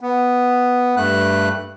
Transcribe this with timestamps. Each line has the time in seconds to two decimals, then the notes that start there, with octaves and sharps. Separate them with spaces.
0.01 B3
0.97 G2 A3 F#6